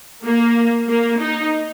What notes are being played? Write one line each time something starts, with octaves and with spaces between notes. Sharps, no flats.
A#3
A#3
D#4